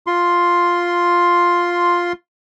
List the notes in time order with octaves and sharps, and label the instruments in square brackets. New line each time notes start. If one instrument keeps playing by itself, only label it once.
[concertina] F4 C6